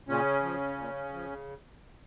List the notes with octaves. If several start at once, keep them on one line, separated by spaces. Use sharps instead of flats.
A#2 C#3 C#4
F3
A#2
F3